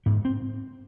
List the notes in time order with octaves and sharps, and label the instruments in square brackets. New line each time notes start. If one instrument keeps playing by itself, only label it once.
[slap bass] G#2 B3
C4